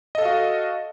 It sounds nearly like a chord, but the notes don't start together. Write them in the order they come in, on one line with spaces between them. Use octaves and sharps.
D#5 A4 F5 F#4